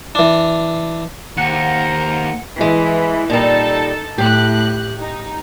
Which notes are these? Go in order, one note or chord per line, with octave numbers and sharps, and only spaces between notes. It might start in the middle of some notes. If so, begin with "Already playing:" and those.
E3 D4
D#2 A#4 C5 F#5 A#5 C#7
E3 G#3
A#2 G3 D#4 A4 A5
A2 G4 F#6
D#4